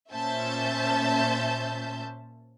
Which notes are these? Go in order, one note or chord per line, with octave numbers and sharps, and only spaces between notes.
A#2 C#4 C5 E5 A5 G6